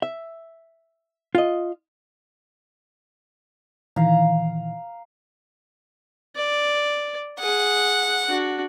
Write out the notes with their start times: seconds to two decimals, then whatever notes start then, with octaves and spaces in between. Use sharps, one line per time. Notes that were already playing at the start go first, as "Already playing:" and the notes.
0.02 E5
1.35 F4 D#5
3.96 A#2 D#3 E3 F5 A#5
6.36 D5
7.40 G#4 F#5
8.28 D4 F#4